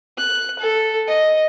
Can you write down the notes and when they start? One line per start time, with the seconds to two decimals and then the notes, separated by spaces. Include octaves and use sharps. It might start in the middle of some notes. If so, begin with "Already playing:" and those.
0.17 F#6
0.59 A4
1.08 D#5